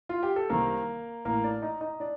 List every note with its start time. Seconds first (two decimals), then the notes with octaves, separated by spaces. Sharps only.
0.09 F4
0.23 G4
0.36 A4
0.50 C2 C3 D#3 A#3 A#4
1.25 A1 A2 A#3 A#4
1.44 D4 D5
1.62 D#4 D#5
1.81 D#4 D#5
2.00 D4 D5